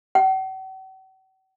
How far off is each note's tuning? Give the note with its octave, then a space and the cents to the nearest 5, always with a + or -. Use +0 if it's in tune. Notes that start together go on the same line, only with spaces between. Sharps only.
F#5 +45